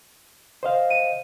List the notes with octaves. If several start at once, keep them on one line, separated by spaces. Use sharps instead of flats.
C5 D#5 F5
D#7